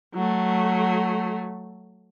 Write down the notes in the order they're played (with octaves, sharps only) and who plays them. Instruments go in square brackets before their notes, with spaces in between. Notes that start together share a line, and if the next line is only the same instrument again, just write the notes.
[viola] F#3 A3